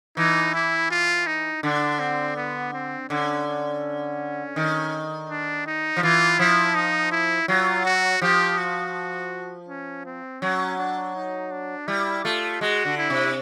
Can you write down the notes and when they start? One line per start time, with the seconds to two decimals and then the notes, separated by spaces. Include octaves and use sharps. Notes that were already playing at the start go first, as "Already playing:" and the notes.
0.17 E3 D#4
0.54 E4
0.91 F4
1.27 D#4
1.63 D3 D4
2.00 C4
2.36 B3
2.73 C4
3.09 D3 C#4
3.47 C#4
4.56 D#3
5.30 D4
5.66 D#4
5.97 F3
6.03 E3 F4
6.39 F3 E4
6.75 D#4
7.12 E4
7.48 F#3 F4
7.85 F#4
8.22 F3 G4
8.58 F#4
9.68 C#4
10.06 C4
10.41 F#3 C#4
10.78 D4
11.15 D#4
11.51 D4
11.88 G3 E4
12.24 A3 F4
12.61 G#3 F#4
12.85 D3
12.98 E4
13.10 C3